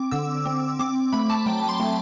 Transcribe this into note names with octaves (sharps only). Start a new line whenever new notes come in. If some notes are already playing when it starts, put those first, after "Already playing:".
Already playing: C4 D6
D3 E6
C4
C4 D6
A3 B5
A5
F#3 G5
C6
A3